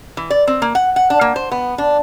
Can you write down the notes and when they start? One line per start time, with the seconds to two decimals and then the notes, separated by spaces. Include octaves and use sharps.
0.17 E3
0.30 D5
0.47 C4
0.62 A#3
0.75 F#5
0.96 F#5
1.10 D4
1.21 A#3
1.36 C5
1.52 B3
1.78 D4